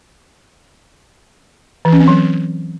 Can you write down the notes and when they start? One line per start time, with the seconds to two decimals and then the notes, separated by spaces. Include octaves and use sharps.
1.85 E3
1.93 C#4
2.00 C4
2.08 F#3